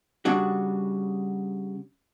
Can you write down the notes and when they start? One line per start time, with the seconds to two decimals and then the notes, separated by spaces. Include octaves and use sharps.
0.25 C#3 G3 D4 F#4